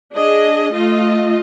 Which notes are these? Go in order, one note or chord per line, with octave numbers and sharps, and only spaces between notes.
D4 G#4 D#5
A3 F4 D#5